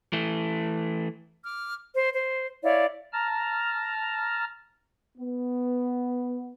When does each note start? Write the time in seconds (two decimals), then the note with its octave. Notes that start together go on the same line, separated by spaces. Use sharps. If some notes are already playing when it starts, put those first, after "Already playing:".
0.13 E3 A3
1.44 D6 F6
1.93 C5
2.13 C5
2.63 E4 C#5 D5 F5
3.13 A5 A#5 F6
5.18 B3